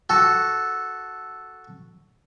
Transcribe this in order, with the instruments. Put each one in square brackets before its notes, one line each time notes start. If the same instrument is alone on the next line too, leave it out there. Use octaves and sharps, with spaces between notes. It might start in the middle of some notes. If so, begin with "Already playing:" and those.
[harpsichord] F#4 A4